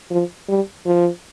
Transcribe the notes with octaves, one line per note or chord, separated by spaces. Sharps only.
F3
G3
F3